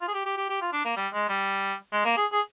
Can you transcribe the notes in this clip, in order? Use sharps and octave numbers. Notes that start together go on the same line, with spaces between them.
F4
G#4
G4
G4
G4
G4
F4
D4
A#3
G3
G#3
G3
G#3
A#3
G#4
G#4